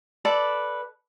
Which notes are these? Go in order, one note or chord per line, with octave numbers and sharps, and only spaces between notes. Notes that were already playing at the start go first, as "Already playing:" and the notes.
A4 B4 D5 D6